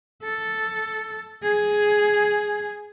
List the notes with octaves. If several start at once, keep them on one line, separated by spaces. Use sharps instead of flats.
A4
G#4